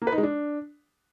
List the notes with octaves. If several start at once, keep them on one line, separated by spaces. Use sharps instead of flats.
A#3
B4
D#4
G#3
D4